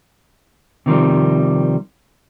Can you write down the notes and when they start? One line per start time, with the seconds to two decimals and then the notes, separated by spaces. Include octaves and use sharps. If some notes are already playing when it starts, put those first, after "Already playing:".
0.86 C3 D#3 F3 G3